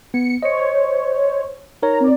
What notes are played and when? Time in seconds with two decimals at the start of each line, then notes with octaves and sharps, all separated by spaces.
0.14 B3 C#7
0.43 C5 C#5 D#5 C#7
1.83 D#4 A#4 C#5 A#5
2.00 C4 D5